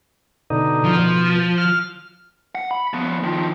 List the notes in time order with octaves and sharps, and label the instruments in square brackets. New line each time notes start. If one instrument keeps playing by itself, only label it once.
[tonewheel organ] B2 D3 D#4
[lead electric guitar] F3
[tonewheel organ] B2
F6
[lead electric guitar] F#5
B5
F3 B3
D#3 F3